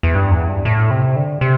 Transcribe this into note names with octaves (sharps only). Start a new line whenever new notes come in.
E2
G2
E2
G2
A2
C3
D3
C3